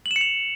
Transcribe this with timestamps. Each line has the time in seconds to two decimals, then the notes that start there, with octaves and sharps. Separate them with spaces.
0.06 F#7
0.11 E7
0.16 C#7
0.21 F7